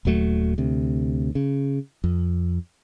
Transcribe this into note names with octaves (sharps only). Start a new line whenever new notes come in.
D#1 D#2 F#3 A3
D2 C3
C#3
F2